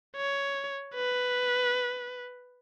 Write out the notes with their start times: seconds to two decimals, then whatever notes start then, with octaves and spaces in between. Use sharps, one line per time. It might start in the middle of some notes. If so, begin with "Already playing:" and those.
0.16 C#5
0.95 B4